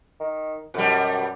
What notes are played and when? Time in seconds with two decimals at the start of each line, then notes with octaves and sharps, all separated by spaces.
0.20 D#3
0.74 F#2 B2 G3